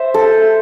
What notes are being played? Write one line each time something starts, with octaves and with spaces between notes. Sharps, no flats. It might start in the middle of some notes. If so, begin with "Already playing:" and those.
Already playing: C5 E5
A4